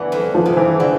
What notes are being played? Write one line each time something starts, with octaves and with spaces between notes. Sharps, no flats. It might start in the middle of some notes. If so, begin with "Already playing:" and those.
Already playing: D3 E3 B3
F2
F3
C3
E3
D3 E3